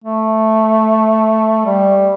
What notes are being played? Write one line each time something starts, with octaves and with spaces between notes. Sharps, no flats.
A3
G3